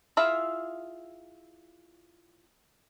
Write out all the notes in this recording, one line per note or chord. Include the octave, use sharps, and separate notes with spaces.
E4 F4 G#4 E5 F5